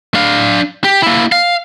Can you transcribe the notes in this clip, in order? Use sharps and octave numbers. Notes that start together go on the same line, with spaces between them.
D4 F5
G4
A#3 E4
F5